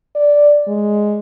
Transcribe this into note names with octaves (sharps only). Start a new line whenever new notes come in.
D5
G#3